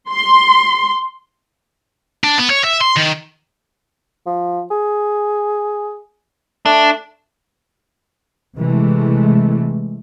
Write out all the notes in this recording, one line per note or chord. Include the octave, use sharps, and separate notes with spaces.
C6
D4
B3
C#5
E5
C6
D#3
F3
G#4
A3 D4
C3 E3 G#3 A3